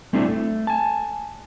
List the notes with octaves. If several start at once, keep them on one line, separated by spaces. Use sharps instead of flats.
G3 A3 C4 D4 E4
A3
G#5 A5